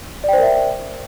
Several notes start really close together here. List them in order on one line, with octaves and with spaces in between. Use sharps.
D5 G5 C5 A#4 E5